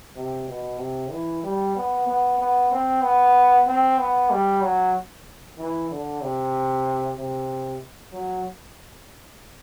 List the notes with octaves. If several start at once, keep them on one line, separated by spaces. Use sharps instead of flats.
C3
B2
C3
E3
G3
B3
B3
B3
C4
B3
C4
B3
G3
F#3
E3
D3
C3
C3
F#3